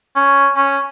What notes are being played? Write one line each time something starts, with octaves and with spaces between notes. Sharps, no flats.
C#4
C#4